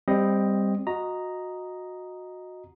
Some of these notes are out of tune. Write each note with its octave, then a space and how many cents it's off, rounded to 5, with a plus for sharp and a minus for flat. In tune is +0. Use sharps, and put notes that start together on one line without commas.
G3 +20 C4 +0 D#5 +0
F#4 -20 D#5 +0 A#5 +0